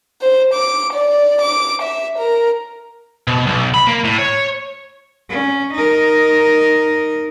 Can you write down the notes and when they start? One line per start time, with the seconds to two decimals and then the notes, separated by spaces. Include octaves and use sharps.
0.22 C5
0.53 D6
0.93 D5
1.42 D6
1.82 E5
2.18 A#4
3.27 B2
3.47 B1
3.74 B5
3.87 A#3
4.04 A2
4.18 C#5
5.29 C#4
5.74 D#4 A#4